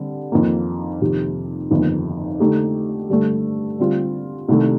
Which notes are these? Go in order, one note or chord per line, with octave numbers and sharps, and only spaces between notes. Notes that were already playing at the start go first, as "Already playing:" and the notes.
Already playing: D3 G3 C4
F2 D#3 A#3
F2 C3 D#3
G1 F2 D#3 A#3
D3 A3 D#4 G4
G2 D3 A3 D4
D3 G3 C4 F4
C2 C3 D#3 A3